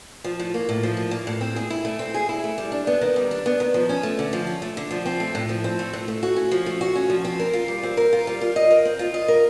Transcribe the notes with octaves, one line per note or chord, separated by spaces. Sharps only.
F3
A2
A#3
A2
F3
A2
A#3
A2
C4
G#4
E4
A3
C4
G#4
E4
A3
G3
D4
B3
D#3
G3
D4
B3
D#3
F3
C#4
A3
D3
F3
C#4
A3
D3
F3
C4
A3
A2
F3
C4
A3
A2
A3
F#4
C#4
F3
A3
F#4
C#4
F3
C4
A#4
F4
G3
C4
A#4
F4
G3
F4
D#5
A#4
C4
F4
D#5
A#4